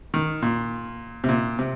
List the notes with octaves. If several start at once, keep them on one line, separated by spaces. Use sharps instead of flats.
D#3
A#2
C3
A#2
C3